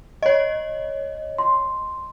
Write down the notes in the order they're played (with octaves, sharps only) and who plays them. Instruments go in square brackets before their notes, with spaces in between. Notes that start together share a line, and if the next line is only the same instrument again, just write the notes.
[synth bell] C#5 D#5
[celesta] C6